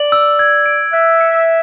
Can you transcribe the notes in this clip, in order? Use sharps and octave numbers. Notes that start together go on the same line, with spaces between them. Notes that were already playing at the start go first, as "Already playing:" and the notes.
Already playing: D5 F#7
E6
G#6
D7
E5 F#6
C#7